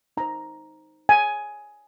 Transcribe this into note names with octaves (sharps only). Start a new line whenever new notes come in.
D#4 C5 A#5
G#5